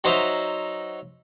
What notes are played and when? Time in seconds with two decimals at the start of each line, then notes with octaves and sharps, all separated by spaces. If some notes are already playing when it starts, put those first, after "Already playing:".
0.04 F#3 D#4 C5 D#5 E5